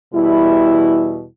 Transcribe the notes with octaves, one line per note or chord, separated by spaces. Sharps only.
E2 B2 G3 E4